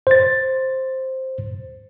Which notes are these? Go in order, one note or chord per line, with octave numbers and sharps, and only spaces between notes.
C5 A6